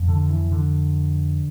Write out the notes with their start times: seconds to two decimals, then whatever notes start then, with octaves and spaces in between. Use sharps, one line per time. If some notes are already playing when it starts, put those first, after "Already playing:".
Already playing: F2
0.08 D3
0.29 E3
0.52 D3